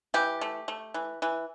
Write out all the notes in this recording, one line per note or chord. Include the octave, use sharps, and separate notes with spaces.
E3 G4
A3
A3
E3
E3